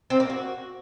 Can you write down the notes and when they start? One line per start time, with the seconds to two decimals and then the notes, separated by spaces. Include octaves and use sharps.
0.10 C4
0.20 A#3
0.30 F#4